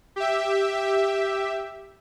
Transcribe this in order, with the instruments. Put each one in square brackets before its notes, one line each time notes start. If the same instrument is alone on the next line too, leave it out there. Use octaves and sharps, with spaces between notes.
[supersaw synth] G4 E5